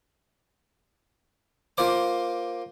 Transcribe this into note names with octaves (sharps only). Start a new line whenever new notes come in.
A#3 F4 C5 D6